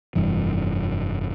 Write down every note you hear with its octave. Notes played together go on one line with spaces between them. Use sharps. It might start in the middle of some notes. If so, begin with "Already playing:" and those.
F1 G2 E3